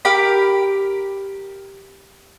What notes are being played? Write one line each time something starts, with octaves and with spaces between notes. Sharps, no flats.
G4 A#4 B5